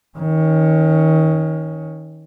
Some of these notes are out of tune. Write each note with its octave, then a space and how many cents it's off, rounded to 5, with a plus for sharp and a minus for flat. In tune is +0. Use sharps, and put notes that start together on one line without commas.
D#3 +30 C#4 +0